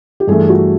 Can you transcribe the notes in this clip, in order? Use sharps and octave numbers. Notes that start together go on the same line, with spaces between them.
G4
G2 E3 A3 G#4
F#4